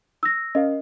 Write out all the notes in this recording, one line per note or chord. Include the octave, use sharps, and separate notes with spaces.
E6 A#6
C#4 A#4 D#5 F5